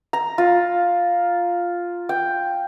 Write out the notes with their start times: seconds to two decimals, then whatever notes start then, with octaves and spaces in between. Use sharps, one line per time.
0.13 A#5
0.38 F4
2.09 G5